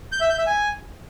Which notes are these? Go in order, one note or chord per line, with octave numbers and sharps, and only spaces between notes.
G6
E5
G6
E5
G#5